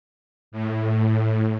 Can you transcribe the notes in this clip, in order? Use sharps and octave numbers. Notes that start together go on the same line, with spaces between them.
A2